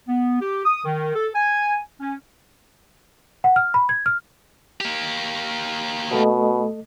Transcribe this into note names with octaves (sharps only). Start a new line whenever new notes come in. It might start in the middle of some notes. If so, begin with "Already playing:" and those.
B3
G4
D#6
D#3
A4
G#5
C#4
F#5
F6
B5
G#6
F6
A#3 G4
B2 A3 A4 D#5